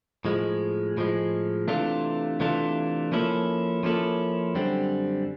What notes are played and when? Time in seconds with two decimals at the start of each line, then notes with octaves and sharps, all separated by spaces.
0.25 A2 F3 G#3
0.97 A2 F3 G#3
1.68 C3 E3 A3 D4 F4
2.40 C3 E3 A3 D4 F4
3.12 F3 A#3 C#4 E4 A4
3.83 F3 A#3 C#4 E4 A4
4.55 F#2 D3 G3 C4